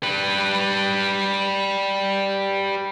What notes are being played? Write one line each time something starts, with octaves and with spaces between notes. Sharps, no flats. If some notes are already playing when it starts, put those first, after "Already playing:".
G3 B4